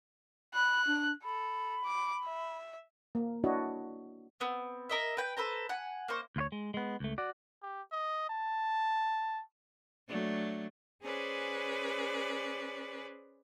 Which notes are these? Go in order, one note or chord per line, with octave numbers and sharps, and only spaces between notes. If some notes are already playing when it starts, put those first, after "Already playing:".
B5 F#6
D4
A4 B5
D6
E5
A#3
D4 E4 F#4 C#5 D#5
B3 C4
A#4 D#5 E5
B4 G5
A4 B4 C5 A#5
F#5 G#5
A#3 D#4 C5 C#6
D2 F4 C#5
G#3
G#3 B3
C#2 A3
F#4 D5
G4
D#5
A5
F#3 A3 D4
C#4 G#4 B4 C5 D5